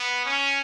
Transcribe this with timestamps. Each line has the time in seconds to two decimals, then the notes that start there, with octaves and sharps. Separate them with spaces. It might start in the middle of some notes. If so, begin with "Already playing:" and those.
Already playing: B3
0.26 C#4